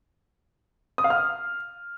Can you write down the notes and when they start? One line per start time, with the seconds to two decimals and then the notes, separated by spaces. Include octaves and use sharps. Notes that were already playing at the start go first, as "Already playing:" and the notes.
0.98 D#6
1.04 F5
1.10 F6